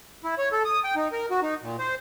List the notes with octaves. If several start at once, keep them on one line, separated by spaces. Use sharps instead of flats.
E4
C#5
A4
D#6
G5
D#4
A#4
F#4
D#4
A#2
C5